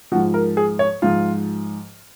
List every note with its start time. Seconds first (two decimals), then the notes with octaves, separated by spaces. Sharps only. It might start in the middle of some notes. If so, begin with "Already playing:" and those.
0.12 F3 F#4
0.15 G#2
0.34 A#4
0.57 G#4
0.79 C#5
1.02 G#2 F3 F4